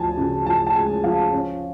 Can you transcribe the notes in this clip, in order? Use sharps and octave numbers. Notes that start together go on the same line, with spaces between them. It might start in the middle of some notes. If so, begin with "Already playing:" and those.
Already playing: D2 F3 G#5 A5
C#3
F3 A5
A5
G#3 G#5
F3 F5
C#4